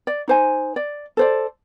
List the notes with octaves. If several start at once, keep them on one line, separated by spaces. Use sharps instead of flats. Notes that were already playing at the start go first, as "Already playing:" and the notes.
D5
D#4 C5 G#5
D5
A4 C5 D5